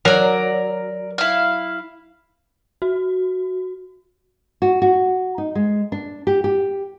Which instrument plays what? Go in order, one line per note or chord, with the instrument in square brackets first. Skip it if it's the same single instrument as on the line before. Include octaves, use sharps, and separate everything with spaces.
[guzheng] F#3 [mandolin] A#4 D5
[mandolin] E4 F5
[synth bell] F#4
[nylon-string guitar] F#4
F#4
D#4
G#3
D4
G4
G4